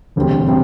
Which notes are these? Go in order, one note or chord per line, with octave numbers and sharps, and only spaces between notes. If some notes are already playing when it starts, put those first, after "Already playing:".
E1 D2 C3 G3 C4
C3 G3 C4